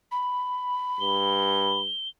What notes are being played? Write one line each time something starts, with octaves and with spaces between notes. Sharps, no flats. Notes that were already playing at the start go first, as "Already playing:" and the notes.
B5
G2 G7